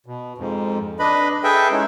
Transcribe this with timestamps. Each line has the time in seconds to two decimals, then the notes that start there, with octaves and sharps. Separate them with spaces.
0.06 B2
0.38 F2 G#2
0.99 D4 B4 D#5 B5
1.44 G#4 A4 B4 E5 G5
1.71 G#3 C#4 D#4 E4